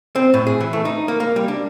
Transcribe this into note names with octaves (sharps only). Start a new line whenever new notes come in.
C4
A2
G#4
E3
A3
D#4
A#3
A#3
G3
D4